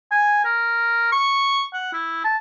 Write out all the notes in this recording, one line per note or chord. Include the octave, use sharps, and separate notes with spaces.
G#5
A#4
C#6
F#5
E4
A5